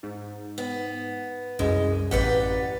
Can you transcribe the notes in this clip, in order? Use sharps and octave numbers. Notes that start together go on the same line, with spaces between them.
G#2
B3
C2 F#2 G#3
A1 G4 B4 D5 F#5